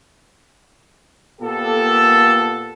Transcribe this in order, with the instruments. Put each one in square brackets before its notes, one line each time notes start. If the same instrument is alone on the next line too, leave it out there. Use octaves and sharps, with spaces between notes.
[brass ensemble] A#2 A#3 B3 G4 A4